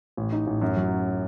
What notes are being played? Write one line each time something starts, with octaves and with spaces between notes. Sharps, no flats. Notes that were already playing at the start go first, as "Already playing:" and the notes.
A1
D#4
A1
F#2
F#3